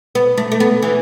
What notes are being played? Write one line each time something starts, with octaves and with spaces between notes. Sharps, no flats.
B3
A3
A3
B3
E3